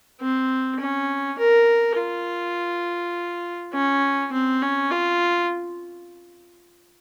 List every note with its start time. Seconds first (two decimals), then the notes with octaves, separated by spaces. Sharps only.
0.21 C4
0.80 C#4
1.38 A#4
1.98 F4
3.73 C#4
4.33 C4
4.62 C#4
4.91 F4